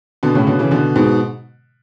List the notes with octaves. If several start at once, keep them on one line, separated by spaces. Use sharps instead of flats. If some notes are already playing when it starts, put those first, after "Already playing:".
B2 D3
A2 C#3
B2 D3
C#3 E3
B2 D3
G#2 B2